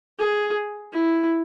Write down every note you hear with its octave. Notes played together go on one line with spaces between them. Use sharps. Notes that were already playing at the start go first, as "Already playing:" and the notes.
G#4
E4